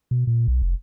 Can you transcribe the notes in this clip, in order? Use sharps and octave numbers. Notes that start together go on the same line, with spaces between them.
B2
A#2
B1
F1